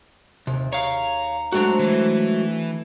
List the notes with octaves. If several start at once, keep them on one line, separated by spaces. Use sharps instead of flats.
D#2 C3
C#5 F5 A#5
F#3 G#3 A3 C4 D4 F#4
E3